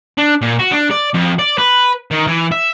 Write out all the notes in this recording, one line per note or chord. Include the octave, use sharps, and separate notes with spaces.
D4
A#2
F#4
D4
D5
F2
D5
B4
D#3
E3
E5